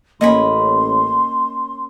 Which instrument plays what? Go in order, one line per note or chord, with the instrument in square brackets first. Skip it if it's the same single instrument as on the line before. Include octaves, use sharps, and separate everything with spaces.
[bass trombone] A1 [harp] A#3 C#4 [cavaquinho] D#5 G#5 B5 [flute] C6